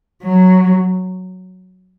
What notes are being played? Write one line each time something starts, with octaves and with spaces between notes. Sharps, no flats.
F#3